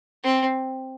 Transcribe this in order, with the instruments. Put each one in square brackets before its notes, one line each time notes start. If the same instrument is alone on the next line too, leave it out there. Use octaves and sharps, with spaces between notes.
[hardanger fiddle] C4